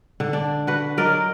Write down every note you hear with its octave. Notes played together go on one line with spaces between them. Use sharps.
D3
D4
F#4 B4
F#3 A#4 D5 D#5